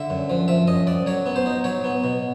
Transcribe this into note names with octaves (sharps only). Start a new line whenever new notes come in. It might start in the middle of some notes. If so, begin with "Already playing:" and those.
Already playing: D3 E5
F#2
F3
F3 E5
F#2 D#5
F#2 D5
F#3 C#5
B3
C5
D#4
F#3 C#5
B3
B2